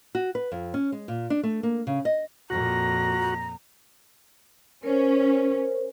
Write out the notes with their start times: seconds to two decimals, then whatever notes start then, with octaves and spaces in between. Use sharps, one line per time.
0.15 F#4
0.35 B4
0.52 F2
0.74 C#4
0.92 G#3
1.08 A#2
1.30 D4
1.43 A3
1.63 A#3
1.87 C#3
2.05 D#5
2.50 F2 A#2 F#4 A#5 A#6
4.83 C#4 A#4 C5